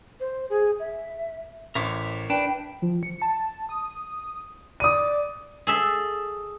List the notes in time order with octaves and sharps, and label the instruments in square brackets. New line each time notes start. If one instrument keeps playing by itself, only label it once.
[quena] C5
G#4
E5
[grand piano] A1 C5 C#6 [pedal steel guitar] A#4 E5 D6
[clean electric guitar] D4 [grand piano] B4 [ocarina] G5
[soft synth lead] F3
C#7
A5
D#6
[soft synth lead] D5 [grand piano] D#6 D#7
[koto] G#4 A4 E5